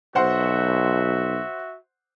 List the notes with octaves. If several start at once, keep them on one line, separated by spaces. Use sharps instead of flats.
B1 F#4 C5 E5 F#5 C6